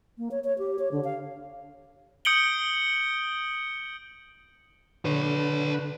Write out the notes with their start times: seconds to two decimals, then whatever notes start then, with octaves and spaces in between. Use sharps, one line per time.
0.18 A#3
0.31 C#5
0.44 C#5
0.58 G4
0.79 C#5
0.92 D3
1.04 F5
2.25 D#6 G6 C#7 D7 F#7 G7
5.05 D3 B4 C#5